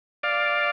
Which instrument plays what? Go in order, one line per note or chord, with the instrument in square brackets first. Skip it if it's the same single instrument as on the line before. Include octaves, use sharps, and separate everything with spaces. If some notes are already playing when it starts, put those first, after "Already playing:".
[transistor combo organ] D5 F5